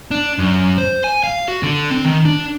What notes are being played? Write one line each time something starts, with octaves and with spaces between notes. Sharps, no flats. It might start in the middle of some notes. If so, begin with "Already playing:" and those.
D4
F#2
C5
G#5
F5
F#4
D3
C4
D#3
D4